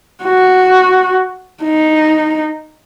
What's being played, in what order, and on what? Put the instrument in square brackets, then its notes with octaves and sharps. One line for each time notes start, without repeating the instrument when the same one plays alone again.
[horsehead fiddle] F#4
D#4